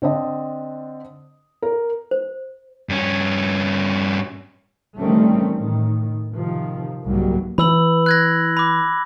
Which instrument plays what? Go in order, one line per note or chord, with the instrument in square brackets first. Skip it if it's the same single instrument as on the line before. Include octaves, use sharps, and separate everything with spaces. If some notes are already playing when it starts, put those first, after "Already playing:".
[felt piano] D3 C4 D4 D#5
A#4
[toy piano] C5
[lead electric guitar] G2 C#4
[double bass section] D#3 E3 G3 A3 C4 C#4
A2 D#3
C3 D#3 F3
F#1 C2 G#2 F#3 G3 A#3
[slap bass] E3 [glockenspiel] B5 E6 F#7
[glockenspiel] F#6 G#6 A#6
B5 D6